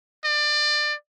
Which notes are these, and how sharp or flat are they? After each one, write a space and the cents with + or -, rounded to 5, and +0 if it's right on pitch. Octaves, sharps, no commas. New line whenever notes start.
D5 +25